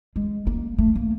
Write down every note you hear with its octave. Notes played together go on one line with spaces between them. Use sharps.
G#3
A#3
A3
A#3